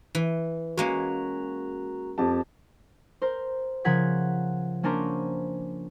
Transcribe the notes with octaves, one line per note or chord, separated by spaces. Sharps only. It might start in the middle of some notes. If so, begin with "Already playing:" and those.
E3
G#3 A#3 C#4 F#4 A#5 F#6
F2 G4 A5
A#4 C5
C#3 F3 A#4 F#5 G#6 B6
A#3 C#4 D4 A#4 C5